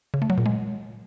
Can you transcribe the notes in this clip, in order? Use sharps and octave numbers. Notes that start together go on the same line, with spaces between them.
C#3
A3
F#3
A#2
G#3